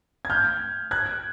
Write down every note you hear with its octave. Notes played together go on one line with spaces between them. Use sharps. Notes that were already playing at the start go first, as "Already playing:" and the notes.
G#6
F6 G6
F#6 G#6